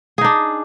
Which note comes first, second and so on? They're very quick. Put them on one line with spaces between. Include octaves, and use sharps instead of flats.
G#4 D#4 D4